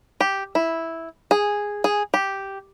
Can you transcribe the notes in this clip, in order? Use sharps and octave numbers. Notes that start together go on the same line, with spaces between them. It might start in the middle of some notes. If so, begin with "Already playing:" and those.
G4
E4
G#4
G#4
G4